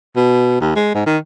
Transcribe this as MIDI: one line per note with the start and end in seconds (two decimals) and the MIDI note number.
0.16 0.60 47
0.61 0.74 39
0.76 0.93 56
0.94 1.06 44
1.06 1.18 51